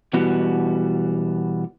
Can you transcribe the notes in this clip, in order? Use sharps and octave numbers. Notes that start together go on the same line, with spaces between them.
B2 E3 G3 B3 F#4